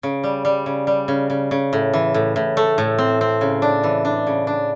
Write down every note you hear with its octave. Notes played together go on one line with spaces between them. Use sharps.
C#3
G3
G3
C#3
G3
C#3
C#3
C#3
A2
E3
A2
A2
A3
A2
C4
C4
C#3
D4
E3
D4
C#3
D4